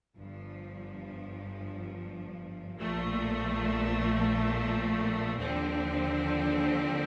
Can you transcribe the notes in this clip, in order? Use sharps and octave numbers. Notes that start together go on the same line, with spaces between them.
G1 G2 F3
A#1 A#2 F3 A3
D#2 D3 F3 C4